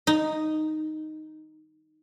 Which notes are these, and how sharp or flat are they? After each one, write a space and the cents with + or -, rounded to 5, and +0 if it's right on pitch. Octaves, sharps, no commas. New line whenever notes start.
D#4 -5